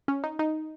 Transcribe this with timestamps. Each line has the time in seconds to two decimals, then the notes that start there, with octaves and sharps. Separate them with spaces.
0.08 C#4
0.24 D#4
0.39 D#4